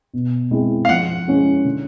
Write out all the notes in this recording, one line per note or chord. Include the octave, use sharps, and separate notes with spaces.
B2
G#3 C4 E4
F5
F3 F#5
G#3 C#4 E4
D3